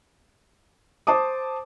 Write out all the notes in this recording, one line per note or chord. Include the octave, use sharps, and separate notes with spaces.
C5 A5 D6 D#6